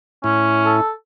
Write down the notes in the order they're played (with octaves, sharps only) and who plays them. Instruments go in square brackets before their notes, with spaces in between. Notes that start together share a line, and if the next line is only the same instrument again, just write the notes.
[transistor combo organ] A2 E4 [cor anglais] C#4
[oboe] A4